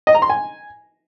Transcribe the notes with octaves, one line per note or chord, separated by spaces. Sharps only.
D#5
A#5
C6
G#5